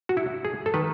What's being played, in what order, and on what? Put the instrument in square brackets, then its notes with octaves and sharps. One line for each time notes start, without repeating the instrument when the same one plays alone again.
[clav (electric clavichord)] F#4
E4
G#4
A4
D#3 B4